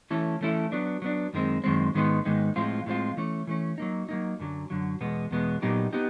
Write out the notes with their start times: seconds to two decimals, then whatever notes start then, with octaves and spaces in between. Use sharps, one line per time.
0.10 E3 A3 C#4 E4 A4
0.41 E3 A3 C#4 E4 A4
0.72 F#3 B3 D4
1.02 F#3 B3 D4
1.33 F#2 D#3 G#3 C4
1.64 F#2 D#3 G#3 C4
1.94 G#2 D#3 G#3 B3 D#4
2.25 G#2 D#3 G#3 B3 D#4
2.56 A2 F3 G#3 C4 F4
2.86 A2 F3 G#3 C4 F4
3.17 E3 A3 C#4
3.47 E3 A3 C#4
3.78 F#3 A#3 D#4
4.09 F#3 A#3 D#4
4.40 F#2 D3 F#3
4.70 F#2 D3 F#3
5.01 E2 B2 G#3 B3
5.31 E2 B2 G#3 B3
5.62 A#2 F#3 B3 D#4 G4
5.93 B3 D#4 G4